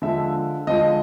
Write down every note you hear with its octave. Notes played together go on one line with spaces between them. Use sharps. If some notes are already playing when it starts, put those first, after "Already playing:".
D3 F3 G#3 E5
D3 F3 G#3 D#5